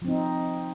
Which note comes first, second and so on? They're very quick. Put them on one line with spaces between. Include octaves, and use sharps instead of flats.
F3 C4 D#4